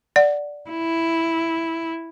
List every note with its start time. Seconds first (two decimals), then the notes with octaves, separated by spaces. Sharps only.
0.16 D5 F#5
0.70 E4